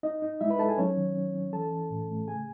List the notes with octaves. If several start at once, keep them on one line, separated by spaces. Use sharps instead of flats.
D#4 D#5
D#4
G#3 E4 E5
B4 B5
D#4 A4 A5
G#4 G#5
F#3 C#4 C#5
D#3
C#4
C#4
E3 A4 A5
E3
A2
A3
C#3 G#4 G#5